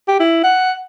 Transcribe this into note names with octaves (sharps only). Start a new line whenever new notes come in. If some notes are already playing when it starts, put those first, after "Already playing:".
G4
E4
F#5